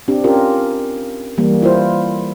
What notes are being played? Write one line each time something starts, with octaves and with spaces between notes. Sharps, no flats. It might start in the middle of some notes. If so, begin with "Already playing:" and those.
C4 D4 G4
C#4 F4 G4 A#4
E3 G3 A#3
E4 F4 C5